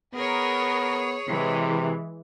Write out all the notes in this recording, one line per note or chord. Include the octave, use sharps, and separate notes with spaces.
B3 G#4 A#4 C#5
C3 E3 G#3